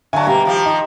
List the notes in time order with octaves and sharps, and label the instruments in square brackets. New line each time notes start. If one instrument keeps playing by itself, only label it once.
[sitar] D3 F#3 [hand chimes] E5 F5 [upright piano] G#5 A5
[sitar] B2 A#3 [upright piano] G3 [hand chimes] G5 A#5
[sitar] D#3 F3 G4
[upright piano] D#4